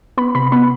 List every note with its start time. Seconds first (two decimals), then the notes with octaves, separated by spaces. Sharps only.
0.18 B3 B5
0.35 C3 B5
0.52 B3 B5